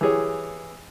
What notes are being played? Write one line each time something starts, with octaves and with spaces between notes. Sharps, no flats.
E3 G4 G#4 C#5